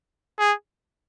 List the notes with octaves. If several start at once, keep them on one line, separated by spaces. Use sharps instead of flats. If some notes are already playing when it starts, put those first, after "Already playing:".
G#4